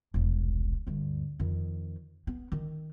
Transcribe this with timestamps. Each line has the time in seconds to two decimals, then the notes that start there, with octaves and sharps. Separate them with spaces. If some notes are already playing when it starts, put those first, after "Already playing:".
0.14 E1 C2
0.87 D2 G2
1.40 F2 D#3
2.27 B3
2.52 D#3